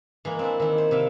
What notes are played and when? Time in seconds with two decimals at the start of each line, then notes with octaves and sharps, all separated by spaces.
0.25 E3 G#3 A#3
0.39 C4 D4 E4
0.60 D#3 E4
0.78 C5
0.91 C3 E5 F5